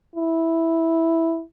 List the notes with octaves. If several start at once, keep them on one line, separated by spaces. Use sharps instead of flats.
E4